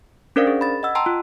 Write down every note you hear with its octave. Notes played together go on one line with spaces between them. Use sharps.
C#4 D4 A#4 C5 D5 F5
G#4
B5 A6
D#5 F#5 E6
G5 A5 A#5 C6 E6
F4